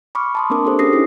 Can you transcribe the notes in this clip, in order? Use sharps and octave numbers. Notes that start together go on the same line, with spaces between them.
B5 C#6 D6 F6
A5 C6 D#6
A#3 C4 D4 A#4 D6 D#6
D4 G4 A4 C5
C#4 G4 G#4 D#6 A#6 C7
C#4 D#4 E4 A4